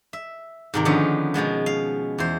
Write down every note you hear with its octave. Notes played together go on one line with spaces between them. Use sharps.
E5
G#2 C3 D#3
D3 D#3 F3 B3 C#4
B2 F3 G#3 B3
F5
E2 C5